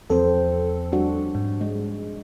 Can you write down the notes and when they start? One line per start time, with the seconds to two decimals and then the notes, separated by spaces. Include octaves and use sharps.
0.10 E2 F3 C4 A4 C5
0.92 G3 D4 F#4
1.35 G#2
1.61 G#3